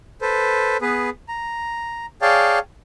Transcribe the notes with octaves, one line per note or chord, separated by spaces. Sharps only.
A4 B4 C5
B3 G#4 B4
A#5
G#4 C#5 D5 F5 G5 A5